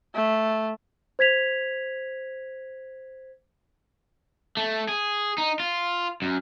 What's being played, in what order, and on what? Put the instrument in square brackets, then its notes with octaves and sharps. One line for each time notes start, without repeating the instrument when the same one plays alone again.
[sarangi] A3
[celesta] C5 G#6 B6 F7
[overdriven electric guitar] A3
G#4
D#4
F4
F#2